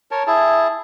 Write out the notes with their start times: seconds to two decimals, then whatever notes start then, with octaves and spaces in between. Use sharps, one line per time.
0.11 A#4 C#5 A5
0.27 E4 G#4 A5